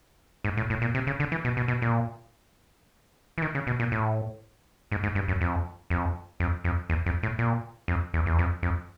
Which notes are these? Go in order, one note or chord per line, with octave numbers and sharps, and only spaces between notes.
G#2
A2
A2
A#2
C3
C#3
D3
E3
B2
B2
B2
A#2
E3
D#3
C#3
B2
A#2
A2
G#2
G#2
G2
F#2
F2
F2
F2
F2
E2
F2
A2
A#2
F2
E2
E2
F2
F2